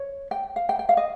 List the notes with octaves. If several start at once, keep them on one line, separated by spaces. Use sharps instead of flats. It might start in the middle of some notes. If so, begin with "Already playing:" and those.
Already playing: C#5
G5
F5
G5
G5
F5
D#5